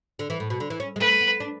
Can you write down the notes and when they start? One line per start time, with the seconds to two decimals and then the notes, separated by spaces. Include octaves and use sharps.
0.19 D3
0.30 E3
0.40 A2
0.50 B2
0.60 D3
0.70 E3
0.80 C#4
0.96 G#3
1.00 A3 B4
1.20 B3
1.40 D4